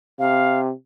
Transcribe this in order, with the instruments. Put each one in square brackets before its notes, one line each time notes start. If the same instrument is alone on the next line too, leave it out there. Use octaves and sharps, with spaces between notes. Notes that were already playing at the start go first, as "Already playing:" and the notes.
[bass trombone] C3 [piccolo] F5